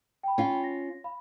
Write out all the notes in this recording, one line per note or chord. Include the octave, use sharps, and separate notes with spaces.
G5 B5
C#4 F4
A#6
F5 B5